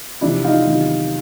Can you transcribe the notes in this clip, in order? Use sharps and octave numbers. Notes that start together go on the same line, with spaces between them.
E2 C3 F3 D4 E4
D#4 F4
E2 C3 D#3 F#3